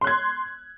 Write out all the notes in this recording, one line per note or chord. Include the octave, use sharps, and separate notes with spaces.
C6 F#6 G#6